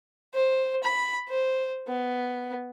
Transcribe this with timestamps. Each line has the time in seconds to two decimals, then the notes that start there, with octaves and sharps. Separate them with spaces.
0.34 C5
0.83 B5
1.28 C5
1.87 B3